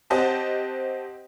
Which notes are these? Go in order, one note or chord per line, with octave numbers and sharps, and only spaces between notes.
C4 G4 C5 D#5 F#5 A5